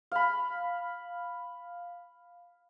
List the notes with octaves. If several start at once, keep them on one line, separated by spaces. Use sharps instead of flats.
F5 B5